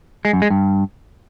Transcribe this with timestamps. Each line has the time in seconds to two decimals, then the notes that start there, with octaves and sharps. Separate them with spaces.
0.25 G#3
0.33 F#2
0.42 G#3
0.50 G2